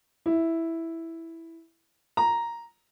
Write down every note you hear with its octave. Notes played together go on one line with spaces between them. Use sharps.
E4
A#5